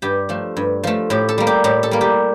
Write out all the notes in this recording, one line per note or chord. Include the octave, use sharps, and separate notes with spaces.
G2 G4
F3 A3
G2
F3 A3
A2 G4
A4
G3 A#3
G4
A2 G4
A4
G3 A#3
G4